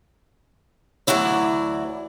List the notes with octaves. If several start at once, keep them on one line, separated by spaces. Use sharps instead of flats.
D2 G#2 E3 F#3 E4 D5